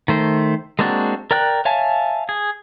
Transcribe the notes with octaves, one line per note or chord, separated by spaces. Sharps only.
D#3 A3 C5
G#3 A#3 C4 D4 F#4
A#4 D5 G5 F#6
C#5 E5 F5 G#5 A5
G#4